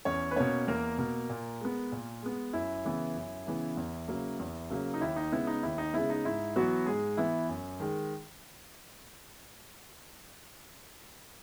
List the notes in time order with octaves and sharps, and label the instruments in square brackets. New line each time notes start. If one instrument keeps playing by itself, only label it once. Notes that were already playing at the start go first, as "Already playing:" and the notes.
[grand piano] E2 C#4 C#5
B4
B2 A#3 C#4 C#5
E2 A#3 A#4
B2 A#3
A#2
G#3 B3
A#2
G#3 B3
F#2 E4
C#3 E3 B3
F#2
C#3 E3 B3
E2
C#3 F#3 A#3
E2
C#3 F#3 A#3
D#4
D#2 E4
D#4
C#3 G#3 B3 E4
D#4
D#2 E4
D#4
C#3 G#3 B3 E4
D#4
G#2 E4
E3 F#3 B3 F#4
G#2 G#3 G#4
E3 B3 E4
F#2
D#3 G#3